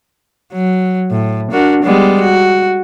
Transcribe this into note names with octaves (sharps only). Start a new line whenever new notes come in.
F#3
A2
D4 F#4 A#4
G3 G#3 B3
F#4